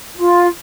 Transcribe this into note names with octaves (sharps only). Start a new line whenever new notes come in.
F4